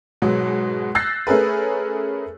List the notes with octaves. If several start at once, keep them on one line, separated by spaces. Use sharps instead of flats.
G#2 B2 F#3 G#3
E6 F#6 G6 A6 A#6 C7
A3 C#4 G#4 A#4 B4